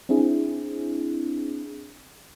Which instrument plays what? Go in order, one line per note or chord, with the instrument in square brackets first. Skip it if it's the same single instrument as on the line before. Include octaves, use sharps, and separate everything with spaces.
[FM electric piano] C4 D4 E4 G#4